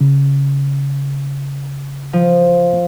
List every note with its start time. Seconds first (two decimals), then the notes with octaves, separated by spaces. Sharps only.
0.01 C#3
2.13 F3